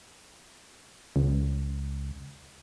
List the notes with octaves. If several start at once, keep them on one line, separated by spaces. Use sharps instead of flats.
C#2